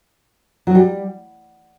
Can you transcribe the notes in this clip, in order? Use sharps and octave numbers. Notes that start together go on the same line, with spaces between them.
F#3
G3